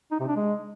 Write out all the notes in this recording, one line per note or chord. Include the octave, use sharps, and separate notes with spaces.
D#4
C3
D4
G#3